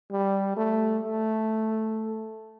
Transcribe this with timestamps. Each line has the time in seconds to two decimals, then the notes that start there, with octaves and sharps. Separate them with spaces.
0.12 G3
0.57 A3
1.03 A3